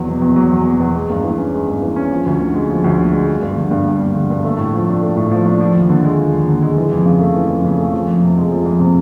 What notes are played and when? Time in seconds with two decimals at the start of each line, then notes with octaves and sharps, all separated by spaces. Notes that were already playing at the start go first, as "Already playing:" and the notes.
Already playing: E2 F#3
0.08 B2
0.22 E2
0.36 F#3
0.51 E2
0.66 B2
0.80 E2
0.95 G#3
1.10 G2
1.24 E3
1.38 C#4
1.54 G#3
1.67 G2
1.82 E3
1.96 C#4
2.11 F3
2.26 D2
2.40 D3
2.55 G#3
2.69 F3
2.84 D2
2.98 D3
3.13 G#3
3.27 G3
3.42 G2
3.57 D3
3.71 G2
3.86 G3
4.01 G2
4.15 D3
4.30 G2
4.45 A3
4.58 A2
4.73 F3
4.88 D4
5.03 A3
5.17 A2
5.31 F3
5.46 D4
5.61 F3
5.75 D#2
5.90 D3
6.04 G#3
6.19 F3
6.33 D#2
6.48 D3
6.62 G#3
6.78 E3
6.92 F2
7.06 C#3
7.20 A3
7.36 E3
7.50 F2
7.64 C#3
7.79 A3
7.93 F3
8.08 F2
8.23 C3
8.37 G#3
8.52 F3
8.66 F2
8.80 C3